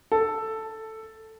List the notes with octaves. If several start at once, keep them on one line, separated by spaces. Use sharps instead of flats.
A4